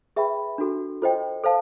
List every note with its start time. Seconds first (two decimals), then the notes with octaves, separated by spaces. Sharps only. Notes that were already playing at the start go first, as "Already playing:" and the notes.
0.16 G#4 B4 E5 G5 B5
0.58 D4 F#4 A4
1.02 F4 A4 C5 D#5 G5
1.44 A4 C5 F5 A5